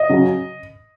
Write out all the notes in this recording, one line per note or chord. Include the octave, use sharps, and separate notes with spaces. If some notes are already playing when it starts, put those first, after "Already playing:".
Already playing: D#5
C#3 F#3